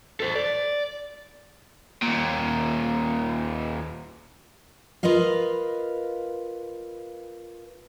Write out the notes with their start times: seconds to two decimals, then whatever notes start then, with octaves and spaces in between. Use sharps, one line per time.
0.20 A4 C5
0.35 D5
2.02 D#2 A#2
5.03 F4 A#4 B4 D#5 F5